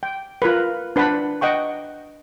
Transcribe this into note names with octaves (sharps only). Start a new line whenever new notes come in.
G5
F4 A#4 B4
D4 B4 C5 F#5 A5 B5
D#5 F#5 G5 C#6